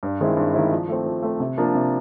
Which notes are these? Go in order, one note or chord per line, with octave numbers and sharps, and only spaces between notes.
G2
D#3 G#3 C4 E4
G2
D#3 G#3 C4 E4
F3
A3 C4
F3
A3 C4
C3
F3 A#3 D4
C3